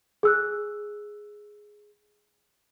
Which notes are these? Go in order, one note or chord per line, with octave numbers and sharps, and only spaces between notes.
G#4 E6 F#6